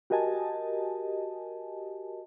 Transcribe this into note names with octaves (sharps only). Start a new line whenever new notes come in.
F#4 G4 A#4 D#5 G#5 A5